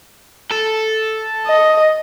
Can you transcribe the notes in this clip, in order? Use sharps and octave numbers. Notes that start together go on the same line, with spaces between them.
A4
D#5